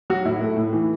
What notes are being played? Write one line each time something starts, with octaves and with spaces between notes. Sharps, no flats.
F#3 F#4
A2 E4
A3
A2
E3